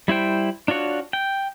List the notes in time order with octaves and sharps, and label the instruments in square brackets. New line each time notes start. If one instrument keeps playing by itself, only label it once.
[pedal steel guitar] G3 E4 C5 G5
D4 F4 F#4 C#5
G5